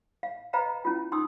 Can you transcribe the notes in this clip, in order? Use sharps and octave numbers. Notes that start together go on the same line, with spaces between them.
F5
B4 D#5 F5 G5 A#5 B5
C#4 E4 F4 G5
D#4 G5 C6 D#6 E6